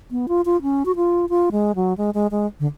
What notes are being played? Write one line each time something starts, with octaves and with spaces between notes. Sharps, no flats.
B3
F4
F4
C#4
F#4
F4
F4
G#3
F#3
G#3
G#3
G#3
D3